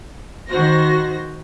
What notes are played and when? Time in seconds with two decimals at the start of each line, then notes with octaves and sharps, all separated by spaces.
0.49 D#3 F#4 C5 A#6